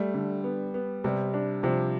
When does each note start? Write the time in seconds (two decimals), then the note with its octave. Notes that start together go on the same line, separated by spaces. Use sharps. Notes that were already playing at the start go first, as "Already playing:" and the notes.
Already playing: G3 A3
0.14 D3
0.44 B3
0.74 B3
1.04 C3 G3
1.34 D4
1.63 C3 F3